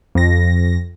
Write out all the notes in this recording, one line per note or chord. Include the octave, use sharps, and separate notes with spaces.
F2 A#6